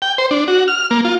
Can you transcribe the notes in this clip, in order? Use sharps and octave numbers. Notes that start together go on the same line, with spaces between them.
G5
C5
D4
F#4
F6
A#3
F4